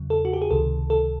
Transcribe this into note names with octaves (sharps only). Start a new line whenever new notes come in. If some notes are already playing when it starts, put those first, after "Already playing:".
Already playing: E2 C#3 F#3
A4
F#4
G4
G#4
C#2 C3 D#3 A4
A4